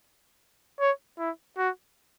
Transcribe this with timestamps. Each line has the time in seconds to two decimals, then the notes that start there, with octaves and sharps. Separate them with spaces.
0.80 C#5
1.19 E4
1.58 F#4